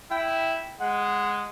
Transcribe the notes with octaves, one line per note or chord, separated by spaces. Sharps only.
E4 G5
G#3 F#5